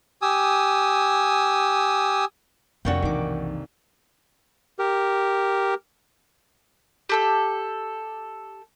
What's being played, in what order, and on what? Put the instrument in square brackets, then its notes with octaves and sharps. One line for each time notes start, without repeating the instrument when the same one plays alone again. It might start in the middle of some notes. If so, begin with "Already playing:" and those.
[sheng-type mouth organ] G4 G#5 D#6 E6
[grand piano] F1 A#3 D4 [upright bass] F2 [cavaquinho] F#4 C#5 G5
[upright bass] B1 E3 [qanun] D#3 D6
[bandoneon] G4 A#4
[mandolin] G4 A4 E6